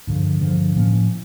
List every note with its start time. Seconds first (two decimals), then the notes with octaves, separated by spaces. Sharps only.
0.07 G2 D3 F3
0.41 G2 D3 F3
0.76 A2 F3 A#3 C#4